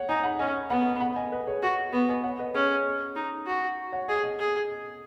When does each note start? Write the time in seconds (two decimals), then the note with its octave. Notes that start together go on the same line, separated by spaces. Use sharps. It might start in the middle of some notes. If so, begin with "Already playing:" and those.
Already playing: C#5 F#5
0.09 D#4 D#5 G#5
0.23 F#5 B5
0.39 C#4 D#5 G#5
0.70 B3 F#5 B5
1.00 F#5 B5
1.16 D#5 G#5
1.32 B4 D#5
1.47 G#4 C#5
1.63 F#4
1.92 B3 B4
2.09 D#5 G#5
2.23 C#5 F#5
2.39 B4 D#5
2.54 C#4 G#4 C#5
3.16 D#4
3.47 F#4
3.92 C#5 F#5
4.08 G#4 D#5 G#5
4.23 D#5 G#5
4.39 G#4